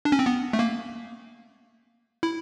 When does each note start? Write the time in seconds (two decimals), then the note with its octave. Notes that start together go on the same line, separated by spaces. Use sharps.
0.05 D4
0.12 C#4
0.19 C4
0.26 B3
0.53 A3
0.59 A#3
2.23 E4